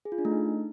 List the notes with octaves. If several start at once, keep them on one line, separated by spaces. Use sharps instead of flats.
G#4
F4
D4
A3
D#4